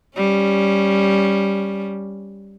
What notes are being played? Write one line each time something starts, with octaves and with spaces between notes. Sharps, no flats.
G3 C#4